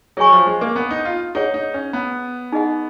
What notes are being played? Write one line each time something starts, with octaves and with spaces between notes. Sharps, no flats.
F#3 G#4 C#5 G#5 C#6
F3
G#3
A#3
B3
D#4
F4
D#4 G#4 C#5 F#5
D#4
C#4
B3
D#4 G#4 D#5 F#5